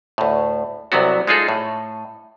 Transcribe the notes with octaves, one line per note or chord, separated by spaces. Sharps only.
D2 A2
C2 C3 F#3 B3 F#4
G#3 D#4 F4 G#4 A4
A2